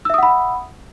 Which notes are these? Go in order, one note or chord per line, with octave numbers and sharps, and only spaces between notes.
E5 F#5 B5 D#6 E6